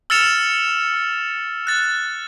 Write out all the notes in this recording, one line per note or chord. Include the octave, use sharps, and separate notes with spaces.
E6 F6 A6 C#7 E7 F7
F#6 A6